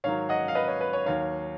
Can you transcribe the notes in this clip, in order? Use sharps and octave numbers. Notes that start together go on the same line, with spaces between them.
G#2 D#3 F#3 C#5 F5
D#5 F#5
F5
B4 D#5
C#5
B4
C#5
D#2 D#3 F#3 C#5 F5